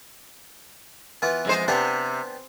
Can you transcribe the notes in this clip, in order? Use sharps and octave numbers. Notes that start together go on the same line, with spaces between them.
E3 B3 F4
F2 G#3 C5
C3 B3 D4 G4